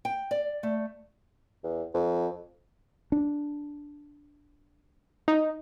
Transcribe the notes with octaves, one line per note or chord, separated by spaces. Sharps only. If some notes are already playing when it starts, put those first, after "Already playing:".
G5
D5
A3
E2
F2
D4
D#4